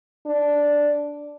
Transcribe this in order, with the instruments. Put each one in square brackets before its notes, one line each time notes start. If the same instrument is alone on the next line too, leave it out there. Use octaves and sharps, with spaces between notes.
[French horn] D4